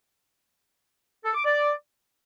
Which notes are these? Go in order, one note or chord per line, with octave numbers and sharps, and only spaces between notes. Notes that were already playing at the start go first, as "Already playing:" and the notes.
A4
D6
D5